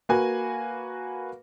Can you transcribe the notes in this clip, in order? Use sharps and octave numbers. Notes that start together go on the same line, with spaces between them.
A#3 F#4 B4 G#5